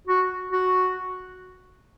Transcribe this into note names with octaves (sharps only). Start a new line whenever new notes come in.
F#4
F#4